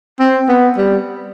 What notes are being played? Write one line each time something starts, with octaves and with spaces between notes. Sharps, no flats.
C4
B3
G3